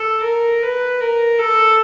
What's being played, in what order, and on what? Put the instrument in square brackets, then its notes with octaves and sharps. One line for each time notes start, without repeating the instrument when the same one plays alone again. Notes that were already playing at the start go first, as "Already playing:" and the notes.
Already playing: [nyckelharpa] A4
A#4
B4
A#4
A4